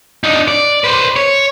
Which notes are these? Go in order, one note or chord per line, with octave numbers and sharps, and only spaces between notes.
D4 D#4
D5
B4 C5
C#5